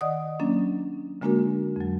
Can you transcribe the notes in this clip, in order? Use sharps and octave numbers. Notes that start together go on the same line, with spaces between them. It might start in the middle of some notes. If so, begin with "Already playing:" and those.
D#3 D5 D#5 F#5 D#6
F#3 A#3 C#4 D4
D3 G#3 A#3 D4 F#4 A#4
F2 F#3